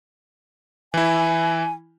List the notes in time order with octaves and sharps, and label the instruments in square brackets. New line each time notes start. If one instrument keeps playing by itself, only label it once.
[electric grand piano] E3 E4 [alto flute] G#5